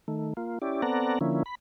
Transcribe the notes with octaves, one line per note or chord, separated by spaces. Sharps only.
D#3 A3
A#3 F4
C#4 E4 G4 D5
B3 C4 A4 D5 F#5 A#5
D3 F3 A#3 C#4 E4
B5